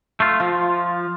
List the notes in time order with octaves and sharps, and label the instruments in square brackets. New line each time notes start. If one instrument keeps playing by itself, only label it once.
[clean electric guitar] A3 F4
[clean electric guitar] F3 [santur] F4